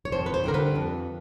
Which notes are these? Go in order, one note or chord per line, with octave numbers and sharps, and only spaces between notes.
C#5
F2 C5
B4
C5
D3 G3 A#4
B4
F2